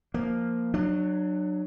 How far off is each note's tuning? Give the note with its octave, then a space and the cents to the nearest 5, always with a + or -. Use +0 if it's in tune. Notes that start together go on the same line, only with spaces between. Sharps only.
F3 -5 A#3 +0
F#3 +0 D4 +35